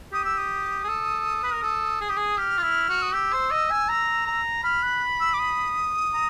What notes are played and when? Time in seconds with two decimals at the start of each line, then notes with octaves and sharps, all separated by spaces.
0.12 G4 D#6
0.25 E6
0.38 D#6
0.84 G#4
0.88 A4
1.44 B4
1.53 A#4
1.63 A4
2.01 G#4
2.09 G4
2.17 G#4
2.38 G4 F6
2.58 F4
2.63 E4
2.89 F#4
3.02 D#6
3.13 G4 E6
3.33 C5
3.51 D#5
3.70 G#5
3.89 A#5
4.26 A#5
4.63 B5 F6
4.83 F#6
5.20 E6
5.34 D6
5.39 D#6
6.14 A#5